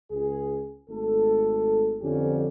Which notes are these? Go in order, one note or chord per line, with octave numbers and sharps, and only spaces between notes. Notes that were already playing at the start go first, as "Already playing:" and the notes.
C#2 G#4
G#1 A3 A4
F2 D3 F3 C#4 G4